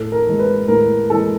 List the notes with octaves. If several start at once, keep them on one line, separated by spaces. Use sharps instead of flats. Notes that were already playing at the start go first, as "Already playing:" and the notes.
Already playing: A2 A4
A#4
E3 G#3
B4
A2 A#4
E3 G#3 A4